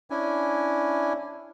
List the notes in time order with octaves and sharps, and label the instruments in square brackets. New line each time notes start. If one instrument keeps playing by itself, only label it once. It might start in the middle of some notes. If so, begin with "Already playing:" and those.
[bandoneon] C#4 D4 E4 G#5